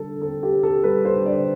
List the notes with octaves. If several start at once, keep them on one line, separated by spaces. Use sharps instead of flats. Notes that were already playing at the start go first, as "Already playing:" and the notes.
Already playing: D3 G3 A4
C4 A4
G4
C4
A4
G3 B4
C5
D3
D5